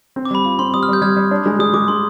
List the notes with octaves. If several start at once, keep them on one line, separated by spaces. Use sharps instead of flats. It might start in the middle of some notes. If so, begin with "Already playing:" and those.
C4
D6
G3 B5
F4 B5
C4 C6
G3 D#6
F6
G3
G6
G3 F6 G#6
G3
D4
G#3
G#3 D#6
G#3 D6
G#3 C6